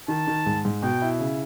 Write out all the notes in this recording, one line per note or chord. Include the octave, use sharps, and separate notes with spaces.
D#3 A5
D#3
G#2
G#2
B2 G5
E4
C#3